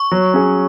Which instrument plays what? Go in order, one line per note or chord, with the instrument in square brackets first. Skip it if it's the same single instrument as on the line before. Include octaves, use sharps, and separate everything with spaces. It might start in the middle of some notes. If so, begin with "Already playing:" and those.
Already playing: [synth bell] C#6
[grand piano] F#3
C#4 G#4